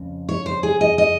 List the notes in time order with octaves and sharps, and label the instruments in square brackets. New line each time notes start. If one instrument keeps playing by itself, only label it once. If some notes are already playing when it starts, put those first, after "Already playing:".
Already playing: [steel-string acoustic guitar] F2 C#3
C#5
C5
G#4
D#5
D#5